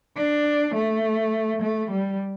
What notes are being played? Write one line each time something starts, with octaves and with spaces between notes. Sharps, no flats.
D4
A3
A3
G3